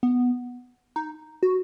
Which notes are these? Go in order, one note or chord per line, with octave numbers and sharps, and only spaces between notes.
B3
D#4
F#4